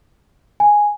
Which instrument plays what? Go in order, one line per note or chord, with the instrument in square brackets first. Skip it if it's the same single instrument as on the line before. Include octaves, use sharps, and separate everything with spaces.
[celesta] G#5